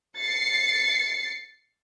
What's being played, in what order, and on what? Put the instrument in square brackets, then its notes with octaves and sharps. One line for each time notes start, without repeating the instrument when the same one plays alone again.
[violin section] A6 C7 C#7